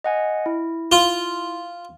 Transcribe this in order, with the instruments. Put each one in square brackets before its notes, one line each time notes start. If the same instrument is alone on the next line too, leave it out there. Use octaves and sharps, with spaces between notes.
[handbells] D#5 F#5 G#5
E4
[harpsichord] F4